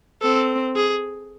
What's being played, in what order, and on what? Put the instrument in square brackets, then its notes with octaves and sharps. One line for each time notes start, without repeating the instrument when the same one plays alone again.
[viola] C4 [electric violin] A4
[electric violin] G#4